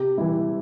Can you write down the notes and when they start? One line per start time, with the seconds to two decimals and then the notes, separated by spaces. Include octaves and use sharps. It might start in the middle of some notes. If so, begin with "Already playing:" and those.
Already playing: C3 G4
0.18 E3 G3 E4